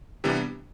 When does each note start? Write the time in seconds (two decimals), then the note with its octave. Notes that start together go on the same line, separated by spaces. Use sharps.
0.24 C3 E3 G3 B3 D4